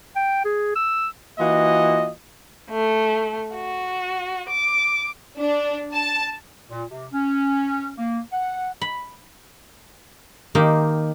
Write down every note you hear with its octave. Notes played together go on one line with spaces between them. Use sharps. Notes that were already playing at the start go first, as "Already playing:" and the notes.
G5
G#4
E6
E3 A#3 F4 F#4 D#5
A3
F#4
D6
D4
A5
A#2
C3
C#4
A#3
F#5
B5
D#3 A#3 G4